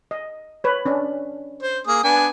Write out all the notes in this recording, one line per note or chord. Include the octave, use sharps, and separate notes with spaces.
D#5
B4 C#5
C#4 D4
C5
A#3 G#4 D#6
B3 D4 G#5